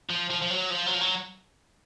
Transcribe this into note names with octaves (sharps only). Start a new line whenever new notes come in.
F3
F3
F3
F#3
F3
F#3
F3
F#3